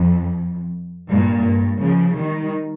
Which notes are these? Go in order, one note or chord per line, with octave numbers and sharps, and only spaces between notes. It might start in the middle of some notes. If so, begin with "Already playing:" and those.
Already playing: F2
G2 A#2
G2
C#3 F3
D#3 G3